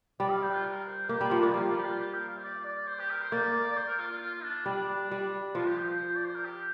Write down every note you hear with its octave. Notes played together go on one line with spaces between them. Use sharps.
G3 D5
F5
C5
F4
A#4
C5
A#3 G4
G3 F4
F3
A#3 D4
G3 F4
F4
G4
F4
G4
A#4
F5
C5
D5
D5
C5
G4
A#4
C5
A#3 D5
D5
C5
A#4
F4
F4
F4
D4
G3 D4
G3
F3 F4
G4
C5
C5
D5
C5
A#4
G4